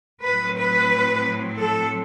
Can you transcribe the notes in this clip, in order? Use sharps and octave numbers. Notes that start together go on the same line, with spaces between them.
A2 F#3 C4 B4
B4
A4